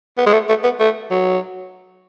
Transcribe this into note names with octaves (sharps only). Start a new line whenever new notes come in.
B3
G#3
A3
A3
B3
A3
F#3